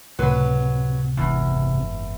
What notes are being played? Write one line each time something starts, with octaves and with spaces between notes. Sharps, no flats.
C#2 A2 C3 F#3 B4
F#1 E2 G#2